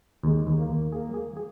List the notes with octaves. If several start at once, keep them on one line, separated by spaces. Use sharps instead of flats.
D#2 G#3
D#2
A#3
D#2
A#3 G#4
G#4
G#4